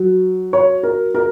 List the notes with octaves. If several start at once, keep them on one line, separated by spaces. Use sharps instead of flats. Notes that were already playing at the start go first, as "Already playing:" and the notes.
Already playing: F#3
C#5
A#4
A#4